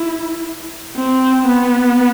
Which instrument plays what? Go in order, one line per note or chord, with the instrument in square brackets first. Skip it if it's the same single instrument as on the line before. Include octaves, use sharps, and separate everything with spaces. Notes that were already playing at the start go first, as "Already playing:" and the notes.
Already playing: [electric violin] E4
C4
B3